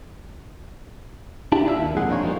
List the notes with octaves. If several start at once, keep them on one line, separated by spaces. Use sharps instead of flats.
D4 E4 G4 A5
D4 E4 F4 E5
D#2 A#2
C2 F2 G#3 G#4 F#5
F3 D4 D#4 F4 C#5
F3 G3 A3 A#3